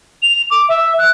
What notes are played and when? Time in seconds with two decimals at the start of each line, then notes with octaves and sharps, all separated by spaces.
0.22 F7
0.51 D6
0.69 E5
0.98 F#6